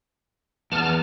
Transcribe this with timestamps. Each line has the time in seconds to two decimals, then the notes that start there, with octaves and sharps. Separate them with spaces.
0.72 E2 B3 A5 F6